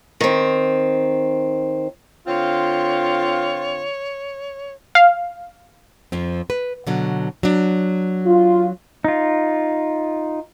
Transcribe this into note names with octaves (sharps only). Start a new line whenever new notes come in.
D#3 C4
D3 C4 F4 C#5
F5
F2 F3 C4
B4
B2 D3 F#3
F#3 D4
F4
D#4 F4